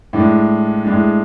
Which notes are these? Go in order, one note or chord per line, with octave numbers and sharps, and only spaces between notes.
A2 G#3 D4
A2 G#3 D4